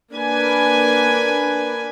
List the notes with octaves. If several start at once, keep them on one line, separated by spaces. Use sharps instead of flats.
A#3 D4 B4 G#5